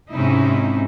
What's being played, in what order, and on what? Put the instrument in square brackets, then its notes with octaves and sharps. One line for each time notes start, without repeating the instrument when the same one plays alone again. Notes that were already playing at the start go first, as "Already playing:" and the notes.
[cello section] G#2 C3 C#4 D#4 E4